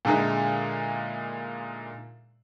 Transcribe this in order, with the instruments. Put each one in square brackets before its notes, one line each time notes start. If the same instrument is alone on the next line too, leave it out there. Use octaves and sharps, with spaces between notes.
[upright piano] A#2 D3 G#3 D#4 E4